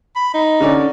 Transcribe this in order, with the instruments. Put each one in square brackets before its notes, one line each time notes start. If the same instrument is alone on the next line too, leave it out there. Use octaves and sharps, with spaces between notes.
[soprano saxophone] B5
D#4
[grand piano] D3 C#4 D5